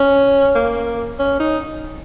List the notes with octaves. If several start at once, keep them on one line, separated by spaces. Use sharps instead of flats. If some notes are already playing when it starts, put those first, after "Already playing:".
Already playing: C#4
A#3
C#4
D#4